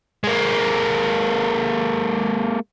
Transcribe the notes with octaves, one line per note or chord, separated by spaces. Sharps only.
G#3 A#3